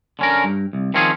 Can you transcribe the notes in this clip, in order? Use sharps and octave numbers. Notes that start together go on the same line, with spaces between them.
D3 C#4 A#4
G2
C2
D#3 F3 C4 C#4 F4 G#4